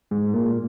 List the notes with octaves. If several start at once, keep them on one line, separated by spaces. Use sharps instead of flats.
G#2
A#2